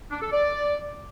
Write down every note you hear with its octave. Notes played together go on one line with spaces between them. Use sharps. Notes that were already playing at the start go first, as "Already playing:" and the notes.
D4
A4
D5